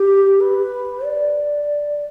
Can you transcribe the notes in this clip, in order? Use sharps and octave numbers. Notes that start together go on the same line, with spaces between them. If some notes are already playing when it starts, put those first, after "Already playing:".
Already playing: G4
B4
D5